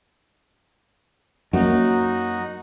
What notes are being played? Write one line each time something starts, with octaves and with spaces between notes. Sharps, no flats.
F#2 F#3 A#3 D#4 F#4